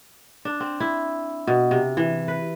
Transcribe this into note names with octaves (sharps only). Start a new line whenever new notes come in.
D4
C4
E4
B2
C3
E3
B4